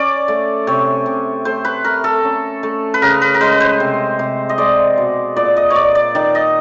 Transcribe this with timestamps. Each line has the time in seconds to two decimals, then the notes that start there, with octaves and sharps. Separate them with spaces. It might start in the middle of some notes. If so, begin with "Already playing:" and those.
Already playing: C#4 D5
0.28 A3
0.67 C3 C#5
1.06 C3
1.45 A3 C5
1.65 B4
1.84 A3 A#4
2.04 A4
2.23 C#4
2.63 A3
2.94 B4
3.02 C#3 A#4
3.21 B4
3.34 A#4
3.41 G#3 B4
3.60 C5
3.80 C3
4.19 C3
4.49 D#5
4.58 G#3 D5
4.98 B2
5.36 A#2 D5
5.57 D#5
5.70 C#5
5.76 A#2 D5
5.95 D5
6.15 D#3 D5
6.35 D#5